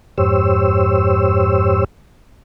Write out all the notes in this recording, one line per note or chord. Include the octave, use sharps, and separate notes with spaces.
F2 G#2 G4 C5 C#5 E6